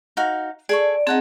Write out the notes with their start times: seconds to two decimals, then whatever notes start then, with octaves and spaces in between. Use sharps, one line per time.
0.17 D#4 F#4 F5
0.69 G#4 A4 D5 C#6
1.07 C4 D#4 G#4 F#5 A5